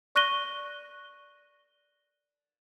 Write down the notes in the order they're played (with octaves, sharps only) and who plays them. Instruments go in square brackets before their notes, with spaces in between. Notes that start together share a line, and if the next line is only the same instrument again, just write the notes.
[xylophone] D5 C#6 F#6 A#6 D#7 G7